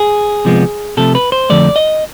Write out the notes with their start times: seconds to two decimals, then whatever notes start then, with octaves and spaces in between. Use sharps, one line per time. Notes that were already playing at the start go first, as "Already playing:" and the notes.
Already playing: G#4
0.45 C3 F3 G#3 B3
0.97 C3 F3 A3 A4
1.15 B4
1.32 C5
1.50 F2 D3 F3 A3 D5
1.76 D#5